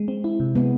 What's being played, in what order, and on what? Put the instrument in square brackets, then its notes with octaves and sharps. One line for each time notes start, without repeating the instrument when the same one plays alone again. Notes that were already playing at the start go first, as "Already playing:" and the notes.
Already playing: [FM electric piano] G#3
C4
E4
C3
[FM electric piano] G#3 [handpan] B3